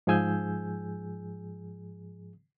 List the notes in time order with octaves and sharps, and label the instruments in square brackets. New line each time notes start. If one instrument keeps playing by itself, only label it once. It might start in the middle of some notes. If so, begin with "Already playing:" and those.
[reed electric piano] G#2 F3 G#4 G#5 E6 G6